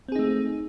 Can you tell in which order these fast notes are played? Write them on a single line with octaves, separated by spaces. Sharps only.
C4 G#4 D#4 A3